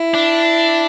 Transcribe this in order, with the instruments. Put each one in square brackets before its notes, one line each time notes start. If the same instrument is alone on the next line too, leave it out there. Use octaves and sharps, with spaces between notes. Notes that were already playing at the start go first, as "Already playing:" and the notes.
Already playing: [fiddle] E4
[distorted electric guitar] D4